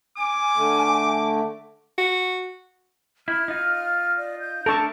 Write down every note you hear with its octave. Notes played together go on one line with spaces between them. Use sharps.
G#5 D6
D3 A3
F#4
E4 F6
D#4 F4
D5
G6
A3 D4 A4 A#4 A5 C#6